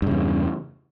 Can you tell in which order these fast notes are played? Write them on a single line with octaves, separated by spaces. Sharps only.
G2 C#3 E2